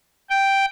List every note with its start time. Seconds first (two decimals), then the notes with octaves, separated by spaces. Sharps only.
0.30 G5